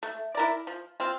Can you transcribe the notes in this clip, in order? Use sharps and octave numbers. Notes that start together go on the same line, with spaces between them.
A3
E4 A#4 D5
F3
C4 F4